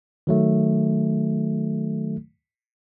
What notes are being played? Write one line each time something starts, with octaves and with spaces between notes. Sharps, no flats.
D#3 F#3 A3